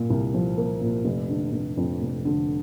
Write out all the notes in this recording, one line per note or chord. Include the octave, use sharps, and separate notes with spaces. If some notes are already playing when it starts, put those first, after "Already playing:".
Already playing: A#2 A#3
C2
F3
A#3
A#2
F1
D3
F1
F2
F1
D3